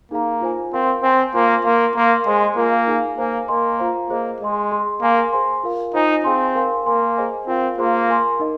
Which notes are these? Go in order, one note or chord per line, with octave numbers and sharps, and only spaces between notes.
A#3 D#4 G#4 F5 A#5
F4 C5 G#5
C4 A#4 F5 C6
C4 C5 G#5 C6
A#3 F4 C5 G#5 C6
A#3 A#4 F5 C6
A#3 A#4 F5 C6
G#3 G#4 C5 D#5 G#5 C6
A#3 F4 A#4 F5 G#5
D#4 G#4 F5 G#5
A#3 C5 F5 G#5
A#3 A#4 D#5 G#5 C6
F4 C5 F5 A#5
A#3 G#4 C5 D#5
G#3 G#4 D#5 C6
G#4 D#5 C6
A#3 A#4 F5 G#5 C6
G#4 C5 G#5 C6
F4 A#4 F5
D#4 F4 C5 D#5 G#5
C4 D#4 G#4 F5 G#5 C6
A#4 F5 G#5 C6
A#3 A#4 G#5 C6
G#4 C5 D#5 G#5
C4 F4 A#4 F5
A#3 F4 G#4 C5 F5 C6
A#4 G#5 C6
D#4 A#4 D#5